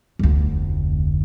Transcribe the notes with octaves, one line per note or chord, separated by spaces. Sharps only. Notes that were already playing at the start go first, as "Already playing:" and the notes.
F1 D2